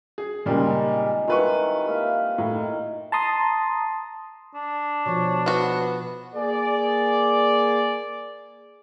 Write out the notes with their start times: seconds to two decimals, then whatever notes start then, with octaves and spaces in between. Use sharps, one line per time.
0.18 G#4
0.46 A#2 C#3 G3 G#3 C4 D#4
1.28 D#3 G3 E4 F4 B4 C#6
1.87 A#3 E5 F5
2.38 A2 D#4
3.12 A5 A#5 C6 D#6
4.54 D4
5.06 B2 F3 C#5
5.46 B3 F#4 B4
6.34 A#3 G#4 D5